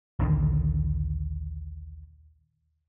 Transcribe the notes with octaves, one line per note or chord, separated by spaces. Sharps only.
A#1 D#2 D3 D#3